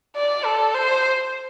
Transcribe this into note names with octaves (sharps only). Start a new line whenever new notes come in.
D5
A4
C5